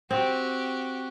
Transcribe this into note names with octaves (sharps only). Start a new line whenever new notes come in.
C4 F#4 G4